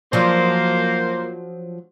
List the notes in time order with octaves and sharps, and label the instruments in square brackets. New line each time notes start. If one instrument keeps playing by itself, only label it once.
[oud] F3 F#3 D4 [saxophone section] A#3 C5